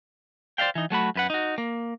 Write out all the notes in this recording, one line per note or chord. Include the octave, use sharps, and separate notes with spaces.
C5 D5 E5 F5 G5
E3 D#4
F#3 A3 F#4 B5
F#2 B4 F#5
D#4 F#4
A#3